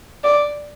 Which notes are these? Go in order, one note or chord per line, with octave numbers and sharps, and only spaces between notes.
D5